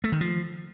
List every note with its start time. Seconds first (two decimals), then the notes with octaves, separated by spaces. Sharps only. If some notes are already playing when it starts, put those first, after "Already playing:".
0.04 A3
0.12 D#3
0.21 F3